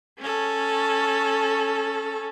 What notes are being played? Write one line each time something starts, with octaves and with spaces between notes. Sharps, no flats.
C#4 A4